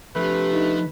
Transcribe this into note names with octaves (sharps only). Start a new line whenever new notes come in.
C3 F3 A3 D4 G4 B4
D#4